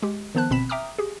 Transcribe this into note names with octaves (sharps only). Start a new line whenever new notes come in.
G#3 G4
D#3 F3 B3 C5 A5 F#6
G1 B2 C4 B5 B6 E7
E5 G5 A#5 D6 D#6 F6
G4 G#4